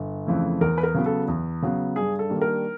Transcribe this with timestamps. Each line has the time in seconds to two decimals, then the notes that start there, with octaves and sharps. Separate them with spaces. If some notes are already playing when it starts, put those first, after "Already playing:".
Already playing: G1
0.27 F2 C#3 E3 A3
0.61 E2 A#4
0.78 B4
0.83 A#4
0.94 C#3 F#3 B3
1.06 A4
1.28 E2
1.62 C#3 F#3 B3
1.96 G2 G#4
2.19 A4
2.29 D#3 G3 A#3 D4
2.42 A#4